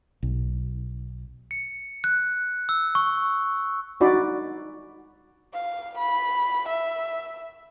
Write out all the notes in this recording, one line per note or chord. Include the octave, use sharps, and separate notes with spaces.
B1
C#7
F#6
E6
C#6
D4 D#4 F#4 D5 B5
F5
B5
E5